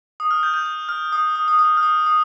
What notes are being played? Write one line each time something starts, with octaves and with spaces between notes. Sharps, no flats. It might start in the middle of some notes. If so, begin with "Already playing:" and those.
D#6
F6
G6
G6
G6
F6
D#6
D#6
D#6
D#6
F6
D#6
D#6